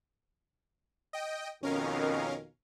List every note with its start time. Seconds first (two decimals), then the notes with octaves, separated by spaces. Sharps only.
1.13 D#5 G5
1.63 F2 B2 D#3 C#4 A#4 F5